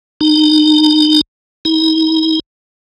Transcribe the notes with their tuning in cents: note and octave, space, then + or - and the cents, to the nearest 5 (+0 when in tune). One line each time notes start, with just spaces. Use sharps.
D#4 -30
D#4 +40